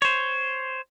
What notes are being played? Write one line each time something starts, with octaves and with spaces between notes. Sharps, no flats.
C5 C#5